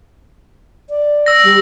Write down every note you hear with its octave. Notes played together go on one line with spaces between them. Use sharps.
D5
E6 A#6
G3